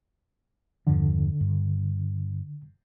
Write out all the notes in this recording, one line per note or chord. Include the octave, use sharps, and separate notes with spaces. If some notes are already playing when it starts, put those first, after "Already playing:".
E2 G2 D3 F3
G2